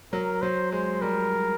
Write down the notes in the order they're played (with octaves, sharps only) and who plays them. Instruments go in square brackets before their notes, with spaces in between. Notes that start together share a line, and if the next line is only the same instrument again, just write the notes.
[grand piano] F#3 [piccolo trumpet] A#4
[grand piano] F#3 [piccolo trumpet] C5
[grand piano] G#3 [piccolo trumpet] C5
[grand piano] G3 [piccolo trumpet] A#4